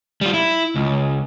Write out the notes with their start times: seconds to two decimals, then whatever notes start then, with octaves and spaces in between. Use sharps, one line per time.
0.21 G3 F4
0.34 E4
0.75 C#2